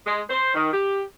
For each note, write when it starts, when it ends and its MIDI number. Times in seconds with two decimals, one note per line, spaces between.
0.06 0.21 56
0.29 0.51 72
0.54 0.72 51
0.72 1.01 67